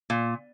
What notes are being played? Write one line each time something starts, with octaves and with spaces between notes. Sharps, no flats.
A#2